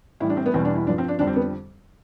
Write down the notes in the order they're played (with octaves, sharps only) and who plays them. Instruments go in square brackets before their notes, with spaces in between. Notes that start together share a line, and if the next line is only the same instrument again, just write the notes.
[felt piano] A2 E3 G3 E4
D4
C4
B3
E2 B2 G3 C4
D4
E4
G2 F3 D4
C4
D4
F2 D3 G3 D4
C4
B3